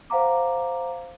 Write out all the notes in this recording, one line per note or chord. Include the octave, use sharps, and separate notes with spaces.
C5 F5 F#5 A#5 D6